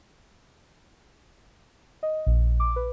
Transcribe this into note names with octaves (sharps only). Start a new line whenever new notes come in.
D#5
A#1
D6
B4